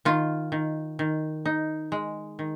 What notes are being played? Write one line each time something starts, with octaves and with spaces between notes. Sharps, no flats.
D#3 F4
D#3
D#3
D#4
G#3
D#3